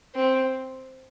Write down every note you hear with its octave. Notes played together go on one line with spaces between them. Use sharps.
C4